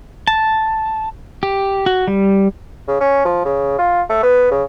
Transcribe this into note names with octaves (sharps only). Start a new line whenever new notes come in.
A5
G4
F#4
G3
C#3
C#4
F3
C#3
F4
A3
B3
C#3